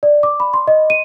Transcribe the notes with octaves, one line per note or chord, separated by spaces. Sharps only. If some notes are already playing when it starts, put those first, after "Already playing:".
D5
D6
B5
C6
D#5
D#7